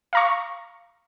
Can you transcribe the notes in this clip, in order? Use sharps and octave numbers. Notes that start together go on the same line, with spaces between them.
F5 A#5 C#6